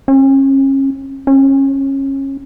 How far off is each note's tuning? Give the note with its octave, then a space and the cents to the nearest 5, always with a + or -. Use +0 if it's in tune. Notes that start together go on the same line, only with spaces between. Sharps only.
C#4 -35
C#4 -25